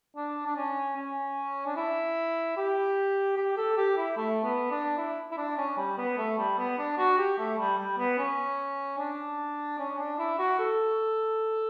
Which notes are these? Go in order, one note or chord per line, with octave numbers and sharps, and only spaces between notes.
D4
D4
C#4
C#4
D4
E4
G4
G4
A4
G4
E4
A3
B3
D4
E4
E4
D4
C#4
G3
B3
A3
G3
B3
D4
F#4
G4
A3
G3
G3
B3
C#4
D4
C#4
D4
E4
F#4
A4